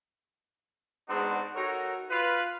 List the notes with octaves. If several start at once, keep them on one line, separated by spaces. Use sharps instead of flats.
G#2 G#3 B3 C4 D4 F#4
D#4 F#4 A4 A#4 C#5
F4 B4